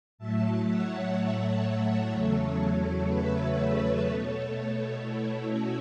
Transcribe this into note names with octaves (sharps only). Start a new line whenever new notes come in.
A2 F#3 A3 E5 A5
C#5 F#5
E2 C#3 F#3 A3 A4 C#5
A4 C#5
B4 E5
B2 A3 A4 C#5
E4 A4
C#4 F#4